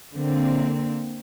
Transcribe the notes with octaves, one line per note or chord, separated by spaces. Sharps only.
D3 A#3 C4